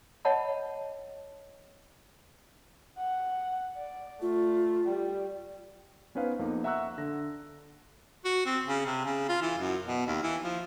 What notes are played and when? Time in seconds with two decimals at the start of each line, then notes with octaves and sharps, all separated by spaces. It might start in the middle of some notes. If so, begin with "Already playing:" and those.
0.25 C#5 D#5 E5 F#5 A5 B5
2.98 F#5
3.77 D5
4.22 A3 F4
4.85 G3
6.15 B3 C#4 D#4 B4 C5 F5
6.39 F2 A#3 B3 D#4
6.64 E5 F#5 A#5 C#6 E6 F#6
6.98 D3 A#6
8.25 F#4
8.45 C4
8.66 C#3
8.86 C3
9.05 C#3
9.29 F4
9.42 E3
9.58 F#2
9.86 B2
10.07 D#2
10.23 E3
10.44 F3